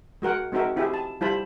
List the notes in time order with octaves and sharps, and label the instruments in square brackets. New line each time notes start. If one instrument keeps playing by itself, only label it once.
[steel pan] G#3 F#4 A#4 F#5
G#3 C4 D#4 F#4 A#4 E5
C4 E4 G4 G#4 E5
A5
G3 E4 F4 C5 A5 B5